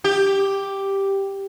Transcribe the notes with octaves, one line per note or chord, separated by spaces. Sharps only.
G4